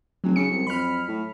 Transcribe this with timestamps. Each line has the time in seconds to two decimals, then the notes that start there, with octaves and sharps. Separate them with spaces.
0.24 F1 F#3
0.36 C#3 C#7
0.50 C2
0.67 F2 B5 F6
1.08 A2